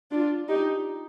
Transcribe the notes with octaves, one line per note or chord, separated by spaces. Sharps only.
D4 F4
D#4 G4